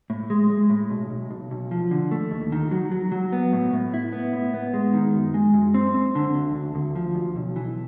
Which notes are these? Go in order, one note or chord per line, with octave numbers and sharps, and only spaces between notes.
A2
G#3
G#3
A2
B1
B1
B1
B1
F3
D3
A3
D#2
D#3
F#3
F#3
F#3
B3
A2
A2
E4
B3
A2
B3
G#3
D#3
F#2
G#3
F#2
C4
C4
D3
D2
D2
D2
F3
D2
B1
E3